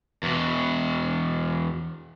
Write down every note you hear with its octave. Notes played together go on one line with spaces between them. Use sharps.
E2 B2